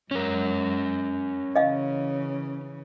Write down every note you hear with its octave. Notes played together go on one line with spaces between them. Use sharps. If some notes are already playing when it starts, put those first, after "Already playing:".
F#2 G#3 C#4 A#4
C#3 E3 D#5 F5